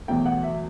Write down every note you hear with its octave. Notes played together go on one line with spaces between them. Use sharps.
E2 B2 F#3 A3 G5
F#5
E5